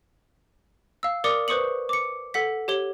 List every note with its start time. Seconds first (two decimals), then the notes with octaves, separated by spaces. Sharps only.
1.03 F5 E6
1.24 A#4 D5 D6 D#6 C#7
1.48 B4 C5 C#6 D#6 C#7 F#7
1.89 D6 C#7
2.34 A4 F#5 B6
2.68 G4 C#5 G7